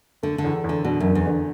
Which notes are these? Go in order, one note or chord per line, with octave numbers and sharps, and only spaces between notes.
D3 A3
D3
E2
E2 D3
B2 D3
F#2
D3
E2
D3